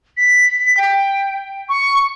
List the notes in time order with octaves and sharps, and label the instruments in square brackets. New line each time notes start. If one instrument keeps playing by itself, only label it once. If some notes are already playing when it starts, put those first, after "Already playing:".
[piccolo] B6
G5
C#6